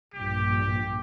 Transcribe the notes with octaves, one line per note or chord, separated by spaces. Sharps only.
A#1 G2 G4